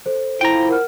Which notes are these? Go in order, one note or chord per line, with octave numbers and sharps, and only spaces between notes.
A4 C5
F3 E4 G5 A#5
A#4 F#5 F6